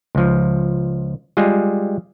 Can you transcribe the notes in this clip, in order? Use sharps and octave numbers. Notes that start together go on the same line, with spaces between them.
C#2 F3
G3 G#3 F4 G#4